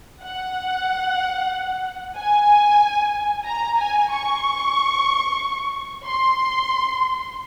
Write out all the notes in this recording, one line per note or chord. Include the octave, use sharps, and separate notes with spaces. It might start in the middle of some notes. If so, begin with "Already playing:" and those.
F#5
G#5
A#5
G#5
C#6
C6